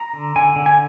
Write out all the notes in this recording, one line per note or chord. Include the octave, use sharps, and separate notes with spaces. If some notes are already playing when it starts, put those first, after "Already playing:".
Already playing: A#5
D3
D3 G#5
D3
G#5